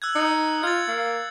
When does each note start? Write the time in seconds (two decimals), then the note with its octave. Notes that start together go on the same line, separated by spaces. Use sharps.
0.02 E6 F#6 G#6
0.15 D#4 C#7
0.63 F4 G#6 A6
0.88 A#3